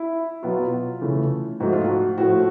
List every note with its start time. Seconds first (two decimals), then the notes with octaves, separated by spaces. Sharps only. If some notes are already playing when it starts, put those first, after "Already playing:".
Already playing: E4
0.43 B2 F#3 B3 F4
1.01 C#3 E3 A3
1.60 G#2 F3 A3 F#4
1.73 F4
1.84 F#4
2.18 A2 F3 A3 F#4